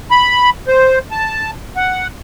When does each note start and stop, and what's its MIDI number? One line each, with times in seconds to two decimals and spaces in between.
0.11 0.50 83
0.68 0.99 72
1.11 1.51 81
1.76 2.08 78